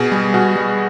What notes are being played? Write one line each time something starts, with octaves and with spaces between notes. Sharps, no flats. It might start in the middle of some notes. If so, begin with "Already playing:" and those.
Already playing: B2 G#4
G3
B2 F#4
G3